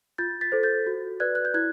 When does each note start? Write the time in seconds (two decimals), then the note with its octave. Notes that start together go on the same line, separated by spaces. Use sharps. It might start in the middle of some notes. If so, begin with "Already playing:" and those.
0.18 F4 G6 A6
0.41 A6 B6
0.52 A4 C5
0.63 G6 A6
0.86 F#4
1.20 B4 D5 F#6 G#6
1.35 F#6
1.45 G6
1.54 E4 F#6 G#6